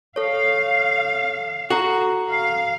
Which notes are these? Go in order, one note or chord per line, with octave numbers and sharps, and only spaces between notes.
A4 C#5 F5
F#4 A4 A#5
F5